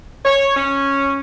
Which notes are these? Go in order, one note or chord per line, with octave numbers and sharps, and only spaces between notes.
C#5
C#4